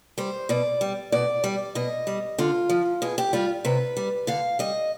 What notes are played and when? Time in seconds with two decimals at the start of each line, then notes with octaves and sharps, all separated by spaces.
0.18 G3 C5
0.49 B2 D5
0.81 G3
1.12 B2 D5
1.44 G3
1.75 B2 D#5
2.07 G3
2.38 D3 F4
2.70 F3
3.02 B2 G#4
3.18 G4
3.33 G3 F4
3.65 C3 B4
3.97 G3
4.27 D3 F5
4.59 G3 D#5